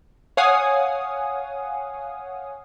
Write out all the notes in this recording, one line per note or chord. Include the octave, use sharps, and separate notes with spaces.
C#5 F5 F#5 G#5 D#6